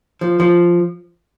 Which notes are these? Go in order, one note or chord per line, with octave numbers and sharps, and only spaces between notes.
F3
F3